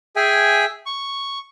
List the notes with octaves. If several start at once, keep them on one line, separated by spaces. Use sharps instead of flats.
G#4 E5 G5 G#5
C#6